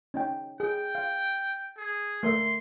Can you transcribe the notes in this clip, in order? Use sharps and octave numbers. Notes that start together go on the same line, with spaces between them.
C#4 D#4 G5
G#4 G5
F5
G#4
A3 A#4 E5 C6